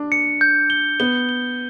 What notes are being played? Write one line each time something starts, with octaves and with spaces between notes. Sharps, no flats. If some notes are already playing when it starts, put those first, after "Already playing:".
Already playing: D4
C#7
G6
G7
B3 G7
G7